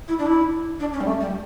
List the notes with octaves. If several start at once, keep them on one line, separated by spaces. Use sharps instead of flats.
E4
D4
E4
D4
C#4
G3
A3
G3